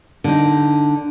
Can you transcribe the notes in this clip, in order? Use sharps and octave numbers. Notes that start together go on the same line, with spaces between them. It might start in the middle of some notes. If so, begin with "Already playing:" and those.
D3 D#4